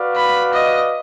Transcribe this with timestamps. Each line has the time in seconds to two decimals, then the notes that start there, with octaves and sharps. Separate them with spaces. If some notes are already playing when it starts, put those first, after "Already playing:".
Already playing: F#4 B4 D5 F5
0.17 B5
0.54 D#5